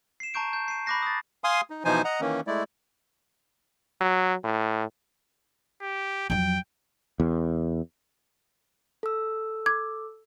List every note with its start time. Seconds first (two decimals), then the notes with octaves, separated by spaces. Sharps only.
0.20 C7 E7
0.34 A5 A#5 C#6 G6 D7
0.53 G6
0.68 C7 D#7
0.86 B5 C#6 D6 F#6 A#6 C7
1.02 D#6 A6
1.44 F5 G#5 C6 D#6
1.70 D#4
1.85 B2 E3 F3 D#4 C5 G#5
2.05 D#5 F#5 A#5
2.21 D#3 E3 A#3 C#4
2.47 G#3 A3 E4 D5
4.01 F#3
4.44 A2
5.82 G4
6.30 F2 F#3 G5
7.20 E2
9.03 A4 E6
9.66 D6 G#6